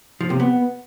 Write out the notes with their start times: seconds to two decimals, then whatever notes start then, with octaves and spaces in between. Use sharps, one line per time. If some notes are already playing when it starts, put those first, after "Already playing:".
0.21 F3
0.30 C3
0.40 B3